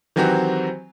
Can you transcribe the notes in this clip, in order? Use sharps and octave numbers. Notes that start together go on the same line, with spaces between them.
D#3 E3 F#3 C4 F#4 G4